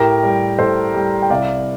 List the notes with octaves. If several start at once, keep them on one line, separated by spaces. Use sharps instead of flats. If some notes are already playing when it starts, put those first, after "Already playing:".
Already playing: A2 G4 A#4
G3
A2 A4 C5
G3
G5
C2 D5 F5